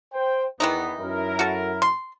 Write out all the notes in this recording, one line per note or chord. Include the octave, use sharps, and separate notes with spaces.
C5 G5
E2 D#3 E3 B3 D#4
F#2 E4 A#4
F#4 A4
C6